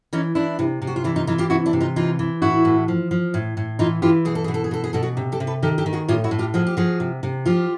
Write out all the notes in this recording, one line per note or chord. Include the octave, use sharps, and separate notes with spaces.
E3 C#4 D#4
E3 D4 E4
C3
C3
F#4
F4
E3 D4 E4
D#4 F4
E3 D#4 F4
F4 G4
C3 E4 F#4
D4 E4
C3
D#4 F4
E3 D#4 F4
E3
A2 E4 F#4
A2
F3
F3
A2
A2
E3 D#4 F4
E3 F4 G4
B2 G#4
A4
B2 G#4
A4
G#4
B2 A4
G#4
B2 A4
F#4 G#4
C3
G4 A4
C3
A4 B4
D#3 G4 A4
G4 A4
D#3
F#4 G#4
A2 F4 G4
E4 F#4
A2
F4 G4
F3 F#4 G#4
G4
F3 F#4 G#4
C3
C3
F3 F4 G4